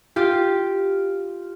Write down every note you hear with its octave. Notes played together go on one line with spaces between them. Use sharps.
F4 G4